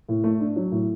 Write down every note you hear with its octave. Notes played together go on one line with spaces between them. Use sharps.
A2
A3
D4
F#3
A2